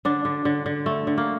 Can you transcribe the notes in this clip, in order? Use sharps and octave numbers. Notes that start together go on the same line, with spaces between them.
D3 D4
D3
D3
D3
A3
D3
A#3